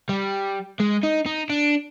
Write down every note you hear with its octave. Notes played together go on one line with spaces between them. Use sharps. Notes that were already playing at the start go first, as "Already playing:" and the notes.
G3
G#3
D#4
D#4
D4